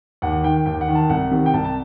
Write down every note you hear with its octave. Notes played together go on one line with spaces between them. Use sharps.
D#2 F#5
D#3 G5
D#2 G5
F#5
D#3
A5
C2 F#5
C3 D#3
G5
C2 A5
A5